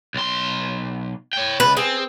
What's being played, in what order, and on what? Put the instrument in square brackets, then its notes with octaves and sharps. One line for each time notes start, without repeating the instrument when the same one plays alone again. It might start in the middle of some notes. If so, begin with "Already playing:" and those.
[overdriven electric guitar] B1 C6
C#5 G5
[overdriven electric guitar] C#2 [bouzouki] B4
[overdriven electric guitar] C4 [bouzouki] G#4